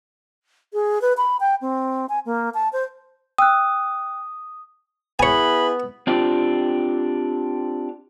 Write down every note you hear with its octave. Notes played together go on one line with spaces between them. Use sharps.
G#4
B4
B5
G5
C4
G#5
A#3
A5
C5
G5 D#6 E6 F#6
B3 E4 G#4 B4 C#5 G#5 B5
C4 D4 F4 G4